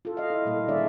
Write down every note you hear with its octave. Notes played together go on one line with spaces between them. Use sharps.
F4 A4
D#5 F5
E4
A#2 G3 A#3 A4
D#3 D4 G#4 C#5 D5 E5